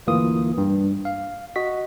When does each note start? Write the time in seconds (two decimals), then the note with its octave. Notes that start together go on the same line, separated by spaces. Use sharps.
0.07 G1 D2 E3 A#3 F4 D#6
0.58 G2
1.05 F5
1.56 F#4 D#5 B6